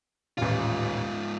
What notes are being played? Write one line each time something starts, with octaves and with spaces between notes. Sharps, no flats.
D#1 A1 G#2 F4